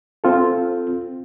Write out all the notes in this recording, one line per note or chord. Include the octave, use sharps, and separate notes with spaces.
C4 F4 A4